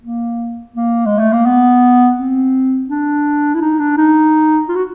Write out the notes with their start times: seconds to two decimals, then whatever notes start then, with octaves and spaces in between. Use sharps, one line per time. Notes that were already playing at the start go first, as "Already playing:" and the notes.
0.03 A#3
0.75 A#3
1.06 G#3
1.19 A3
1.33 A#3
1.46 B3
2.18 C4
2.89 D4
3.54 E4
3.61 D#4
3.79 D4
3.97 D#4
4.68 F4
4.75 F#4